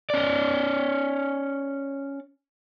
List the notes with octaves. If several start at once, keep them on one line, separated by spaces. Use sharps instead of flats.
C#4 D5